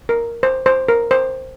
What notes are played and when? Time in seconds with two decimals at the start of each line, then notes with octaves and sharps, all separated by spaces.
0.09 A#4
0.43 C5
0.66 C5
0.89 A#4
1.11 C5